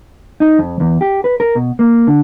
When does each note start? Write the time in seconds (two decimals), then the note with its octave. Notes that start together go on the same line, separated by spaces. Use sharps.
0.40 D#4
0.59 F2
0.80 E2
1.01 G4
1.24 B4
1.40 A#4
1.55 B2
1.79 A#3
2.07 D3